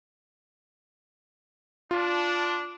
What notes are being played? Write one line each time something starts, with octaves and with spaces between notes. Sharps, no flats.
D4 F4